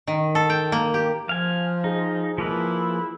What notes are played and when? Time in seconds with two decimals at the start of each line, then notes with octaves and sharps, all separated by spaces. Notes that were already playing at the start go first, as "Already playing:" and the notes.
0.07 D#3
0.35 A4
0.50 G5
0.72 A#3
0.94 G4
1.29 F3 F5 G#5
1.84 D#4 G#4
2.38 F3 A#3 E4 B4